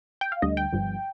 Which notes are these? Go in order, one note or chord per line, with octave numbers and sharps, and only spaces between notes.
G5
F5
D2 D3 G3 D#5
G5
G1 G2 F3